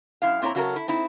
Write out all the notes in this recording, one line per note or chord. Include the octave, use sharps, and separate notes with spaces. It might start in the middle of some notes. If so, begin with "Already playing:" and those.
F#2 E4 F5
A#2 C4 E4 C#5 A#5
C#3 F#3 F#4 A4 A#4
E4
C4 D#4 E4